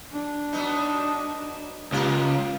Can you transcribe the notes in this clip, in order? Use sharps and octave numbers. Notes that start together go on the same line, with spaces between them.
D4
F#3 B3 D#4
C#2 A#3 F4 G4